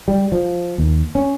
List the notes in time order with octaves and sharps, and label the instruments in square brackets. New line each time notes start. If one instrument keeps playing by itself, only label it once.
[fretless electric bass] G3
F3
D#2
C#4